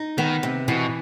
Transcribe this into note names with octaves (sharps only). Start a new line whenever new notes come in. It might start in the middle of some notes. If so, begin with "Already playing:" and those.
Already playing: D#4
D#3 B3
C3
B2 E3